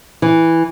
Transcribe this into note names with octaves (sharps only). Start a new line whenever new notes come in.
E3